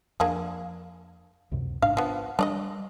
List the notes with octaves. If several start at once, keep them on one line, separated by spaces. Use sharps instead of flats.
F2 A#3 D4 G#4
C#2 F#2 C3
A1 G#2 D4 F5
F3 B3 D4
G3 D4 D5 D#5